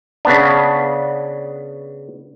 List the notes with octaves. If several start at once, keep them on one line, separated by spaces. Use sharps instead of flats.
C#3 B3 D4